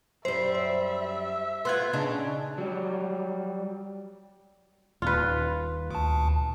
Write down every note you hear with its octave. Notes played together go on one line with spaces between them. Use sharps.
F#2 G3 C5 E5
C5
B3 F4 C6 F#6 G#6
C#3 D4 D#4
F#3 G3
D#1 F4 B4
D2 A5